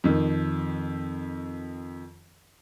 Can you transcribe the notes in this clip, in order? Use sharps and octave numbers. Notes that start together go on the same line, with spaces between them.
F2 D#3